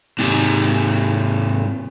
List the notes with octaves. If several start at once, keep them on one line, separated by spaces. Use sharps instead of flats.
G#2 C3